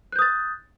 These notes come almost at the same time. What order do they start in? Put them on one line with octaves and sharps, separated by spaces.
F#6 G6 D#6 A6